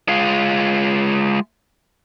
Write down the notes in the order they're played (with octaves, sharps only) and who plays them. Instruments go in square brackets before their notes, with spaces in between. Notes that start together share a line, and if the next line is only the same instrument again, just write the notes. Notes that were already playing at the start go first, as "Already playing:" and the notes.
[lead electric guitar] G#3 F4